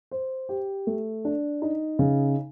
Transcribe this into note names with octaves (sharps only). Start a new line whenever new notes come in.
C5
G4
A3
D4
D#4
C#3